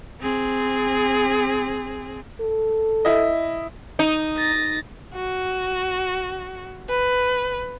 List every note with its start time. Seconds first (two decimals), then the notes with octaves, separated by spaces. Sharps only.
0.21 C4 G#4
2.41 A4
3.05 E4 D#5
3.99 D#4
4.37 A6 A#6
5.14 F#4
6.88 B4